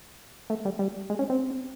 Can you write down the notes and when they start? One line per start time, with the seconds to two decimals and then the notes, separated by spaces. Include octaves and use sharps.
0.50 A3
0.65 G3
0.79 G3
1.10 G#3
1.19 C#4
1.30 C4